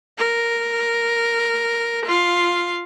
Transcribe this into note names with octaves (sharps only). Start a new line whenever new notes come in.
A#4
F4 F5